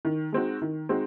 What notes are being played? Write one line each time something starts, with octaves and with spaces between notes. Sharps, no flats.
D#3
G#3 C4 D#4 F#4
D#3
G#3 C4 D#4 F#4